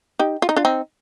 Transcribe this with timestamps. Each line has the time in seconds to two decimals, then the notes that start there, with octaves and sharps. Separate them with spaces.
0.19 D#4 G4
0.42 F4
0.49 D#4
0.57 D4 F4
0.65 C4 D#4